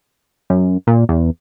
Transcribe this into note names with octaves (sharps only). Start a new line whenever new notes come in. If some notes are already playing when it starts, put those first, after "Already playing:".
F#2
A#2
E2